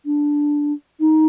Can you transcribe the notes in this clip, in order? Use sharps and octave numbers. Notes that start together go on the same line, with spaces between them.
D4
D#4